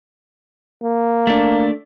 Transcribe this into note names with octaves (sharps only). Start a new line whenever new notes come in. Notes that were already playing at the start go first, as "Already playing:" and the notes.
A#3
A3 D4